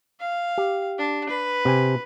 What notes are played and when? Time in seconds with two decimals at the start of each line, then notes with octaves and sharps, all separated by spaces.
0.20 F5
0.58 G4
0.98 D4
1.29 B4
1.65 C3 G5 G#5